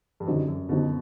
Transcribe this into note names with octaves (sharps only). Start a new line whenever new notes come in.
G2
F#2 D3 G3 C4 D#4 F#4
F#2
B2 D3 G3 C4 D#4 F#4